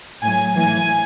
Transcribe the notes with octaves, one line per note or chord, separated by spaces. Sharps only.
A2 F#3 G#5
A2 E3 G#5